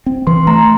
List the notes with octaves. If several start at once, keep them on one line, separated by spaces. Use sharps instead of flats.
C4
E3 C6
A3 A#5